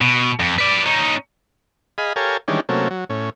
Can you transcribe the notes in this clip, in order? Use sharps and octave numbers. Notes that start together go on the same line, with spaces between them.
B2
F2
B4 D5
C#4 D#4
G#4 D#5 F5 B5
G4 A4 A#4 C#5 F5 G#5
D#3 E3 G3 G#3 C#4 D4
C3 F#3 A3 A#3 C#4
F#3
A2 C#4